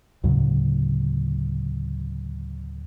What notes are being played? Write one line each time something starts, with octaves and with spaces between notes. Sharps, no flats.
D2 A2 C#3 F#3